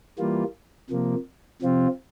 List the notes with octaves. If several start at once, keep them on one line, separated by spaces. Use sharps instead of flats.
E3 G3 A#3 F4
C3 F3 A#3
C3 F3 C4 F4